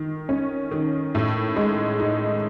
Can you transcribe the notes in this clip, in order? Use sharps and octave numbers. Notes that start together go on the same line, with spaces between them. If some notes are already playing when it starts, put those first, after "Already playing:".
Already playing: D#3
C#4
D#3
A2
G#3
D#4